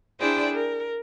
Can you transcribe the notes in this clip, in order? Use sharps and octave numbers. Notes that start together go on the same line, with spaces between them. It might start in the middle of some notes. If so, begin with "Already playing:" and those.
D4 E4 G#4 C5 D5 G5
A#4